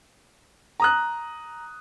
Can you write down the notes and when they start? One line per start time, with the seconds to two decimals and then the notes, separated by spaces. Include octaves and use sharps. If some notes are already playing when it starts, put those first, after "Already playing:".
0.80 A#5 D#6 F#6